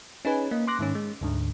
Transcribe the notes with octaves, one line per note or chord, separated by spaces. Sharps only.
C#4 D#4 G#4 B4 G#5
A#3 D#5
C6 D6 F#6 A#6
G#2 D#3 C#4
G#3
D2 G#2 D3